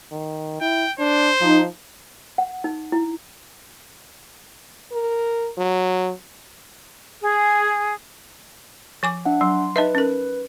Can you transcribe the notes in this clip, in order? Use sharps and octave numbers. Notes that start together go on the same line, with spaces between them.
D#3
E4 G5
D4 C5
F3 D#4
F#5
D#4
E4
A#4
F#3
G#4
F3 G#5 D6
D4 E5 F#5
F#3 C6
D#4 B4 D#5 E5
C#4 A#4